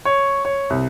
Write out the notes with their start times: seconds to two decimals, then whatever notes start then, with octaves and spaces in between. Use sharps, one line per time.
0.05 C#5
0.45 C#5
0.70 C2